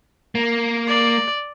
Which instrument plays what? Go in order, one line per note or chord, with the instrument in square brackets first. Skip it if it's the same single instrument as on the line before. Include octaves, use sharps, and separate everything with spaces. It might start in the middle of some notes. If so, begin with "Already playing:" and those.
[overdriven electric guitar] A#3
[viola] D5